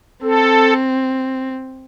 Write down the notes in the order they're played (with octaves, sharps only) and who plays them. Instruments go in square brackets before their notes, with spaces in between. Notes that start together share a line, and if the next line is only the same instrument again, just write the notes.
[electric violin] C4 [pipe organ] A4